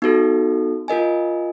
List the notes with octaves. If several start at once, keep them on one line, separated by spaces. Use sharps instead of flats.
B3 D#4 F#4 A4
F4 A#4 D#5 G#5